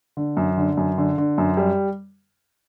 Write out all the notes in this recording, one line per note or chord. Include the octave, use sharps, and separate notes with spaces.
D3
F#2
D3
F#2
D3
D3
F#2
G3